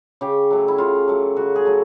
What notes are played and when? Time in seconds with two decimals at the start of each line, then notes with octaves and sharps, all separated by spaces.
0.21 C#3 G4
0.51 F#3 A3
0.68 E4
0.78 C#3 F4
1.08 F#3 A3
1.37 C#3 F#4
1.56 G#4
1.65 F#3 A3